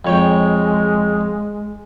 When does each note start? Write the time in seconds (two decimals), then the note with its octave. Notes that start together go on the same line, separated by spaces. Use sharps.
0.05 F2 G#3 C#5 G5